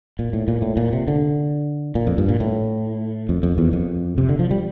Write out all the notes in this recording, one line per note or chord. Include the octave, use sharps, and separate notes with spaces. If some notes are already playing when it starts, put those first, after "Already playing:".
A#2
A2
A#2
A2
A#2
C3
D3
A#2
F2
G2
A#2
A2
F2
F2
E2
F2
C3
D3
F3
G3